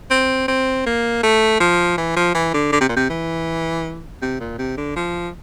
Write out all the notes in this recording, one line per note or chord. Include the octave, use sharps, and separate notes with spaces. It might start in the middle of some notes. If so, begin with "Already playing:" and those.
C4
C4
A#3
A3
F3
E3
F3
E3
D3
D3
C3
A#2
C3
E3
C3
A#2
C3
D3
F3